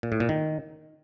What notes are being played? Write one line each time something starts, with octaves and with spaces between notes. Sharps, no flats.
A#2
A2
A#2
D#3